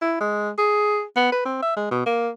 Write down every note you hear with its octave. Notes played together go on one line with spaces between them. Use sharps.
E4
G#3
G#4
B3
B4
C4
E5
G#3
B2
A#3